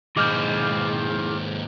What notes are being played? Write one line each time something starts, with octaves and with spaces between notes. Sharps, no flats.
D#2 G#2 E4 G#4 D#5 D6 F6 G6